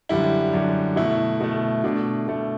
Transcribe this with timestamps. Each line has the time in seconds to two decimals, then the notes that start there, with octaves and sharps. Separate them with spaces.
0.09 F#2 D3 G3 E4
0.53 F#2 D3 G3
0.96 B2 A3 E4
1.40 B2 A3
1.84 B2 A3 D4
2.27 B2 A3